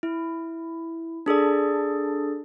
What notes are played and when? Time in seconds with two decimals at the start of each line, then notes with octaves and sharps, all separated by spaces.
0.03 E4
1.26 D4 G#4 A4 D5